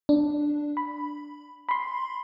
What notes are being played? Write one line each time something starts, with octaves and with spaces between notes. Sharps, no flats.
D4
B5
B5 C6